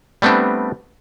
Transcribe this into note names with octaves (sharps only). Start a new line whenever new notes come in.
G3 A3 B3 C4 D4